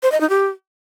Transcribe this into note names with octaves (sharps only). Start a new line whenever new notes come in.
C5
D#5
D#4
G4